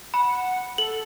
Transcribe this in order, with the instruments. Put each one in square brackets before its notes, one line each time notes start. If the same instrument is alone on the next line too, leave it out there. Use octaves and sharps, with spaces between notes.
[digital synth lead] F#5 [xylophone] B5
[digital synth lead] A4 [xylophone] F#7